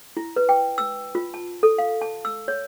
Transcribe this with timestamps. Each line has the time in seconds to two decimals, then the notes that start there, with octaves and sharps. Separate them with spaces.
0.17 E4
0.36 B4
0.49 G5
0.78 E6
1.15 F4
1.34 A5
1.63 A4
1.78 F5
2.01 A5
2.25 E6
2.48 C#5